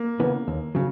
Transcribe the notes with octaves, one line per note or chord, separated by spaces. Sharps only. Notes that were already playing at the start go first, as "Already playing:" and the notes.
Already playing: A#3
C#3 E3 B3
D#2
C#3 F#3